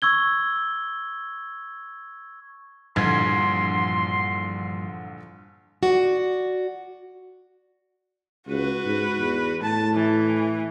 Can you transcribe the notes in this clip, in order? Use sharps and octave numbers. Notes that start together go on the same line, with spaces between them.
C#6 E6 G#6 G7
A#1 G2 A#2 D3 E3 C6 G#6
F#4 D5
C#2 F#4 B4
G#2
E2
A2 A5
E3